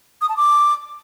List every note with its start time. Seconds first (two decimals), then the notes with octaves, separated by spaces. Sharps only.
0.21 D#6
0.29 A5
0.37 D6